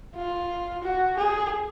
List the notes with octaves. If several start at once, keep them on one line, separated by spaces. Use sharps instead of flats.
F4
F#4
G#4